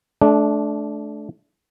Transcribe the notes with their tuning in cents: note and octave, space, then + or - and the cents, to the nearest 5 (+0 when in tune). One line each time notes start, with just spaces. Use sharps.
A3 -30 D4 -5